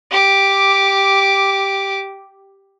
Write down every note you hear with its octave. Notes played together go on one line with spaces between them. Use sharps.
G4 D6